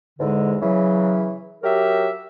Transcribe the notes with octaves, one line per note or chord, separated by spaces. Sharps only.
E2 G#2 D3 G#3
C#3 E3 F#3
F#3 G4 A#4 E5